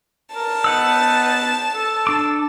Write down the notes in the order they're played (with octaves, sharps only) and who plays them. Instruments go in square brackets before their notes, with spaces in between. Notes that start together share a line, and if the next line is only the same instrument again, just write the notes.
[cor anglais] A#4 [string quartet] A5
[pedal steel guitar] B3 F#5 E6 [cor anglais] D#4
[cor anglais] A4
[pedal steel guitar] D4 D6